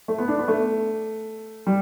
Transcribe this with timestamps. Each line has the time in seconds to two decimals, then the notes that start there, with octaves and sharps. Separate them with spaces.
0.08 A3
0.18 B3
0.28 D4
0.39 B3
0.48 A3
1.67 G3